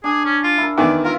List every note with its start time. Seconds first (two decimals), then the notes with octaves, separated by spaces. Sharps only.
0.04 D4 G#4 G#5
0.25 C#4
0.43 F4
0.58 E4 A#4
0.78 E2 D#3 D5
1.05 F4 A#4 E5